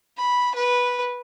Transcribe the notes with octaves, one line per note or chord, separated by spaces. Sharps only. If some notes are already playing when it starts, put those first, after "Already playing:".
B5
B4